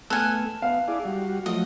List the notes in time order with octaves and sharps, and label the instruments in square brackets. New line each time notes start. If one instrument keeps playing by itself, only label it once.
[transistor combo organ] A3 B3 [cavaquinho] A4 G#5 [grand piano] F6 F#6
[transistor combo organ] B3 [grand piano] F5
[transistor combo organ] E4 G#4 D5
G3 F#4
[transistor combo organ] F3 F#3 A3 [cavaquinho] D#5